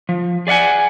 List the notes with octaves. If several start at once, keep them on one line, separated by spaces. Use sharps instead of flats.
F3
G#4 D5 E5 F#5 G#5